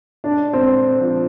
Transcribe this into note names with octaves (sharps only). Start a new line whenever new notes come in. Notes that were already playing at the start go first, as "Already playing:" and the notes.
D4
C4
F3